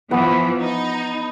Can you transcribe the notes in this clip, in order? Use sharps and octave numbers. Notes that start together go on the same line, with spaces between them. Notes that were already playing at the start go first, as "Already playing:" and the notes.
E3 F3 B3 B5
D#4